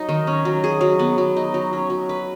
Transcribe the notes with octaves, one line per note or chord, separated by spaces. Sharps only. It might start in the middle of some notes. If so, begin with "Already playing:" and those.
Already playing: F#3 D#4
D#3
C#4
F#3
G#4
F#3
B3
F#3
D#4
F#3
C#4
F#3
B4